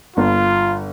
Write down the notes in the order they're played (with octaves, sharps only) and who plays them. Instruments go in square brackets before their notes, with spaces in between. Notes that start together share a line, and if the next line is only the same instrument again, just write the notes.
[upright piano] G1 [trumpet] F4